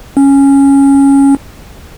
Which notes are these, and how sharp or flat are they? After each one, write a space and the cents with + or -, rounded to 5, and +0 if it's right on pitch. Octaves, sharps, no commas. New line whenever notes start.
C#4 -5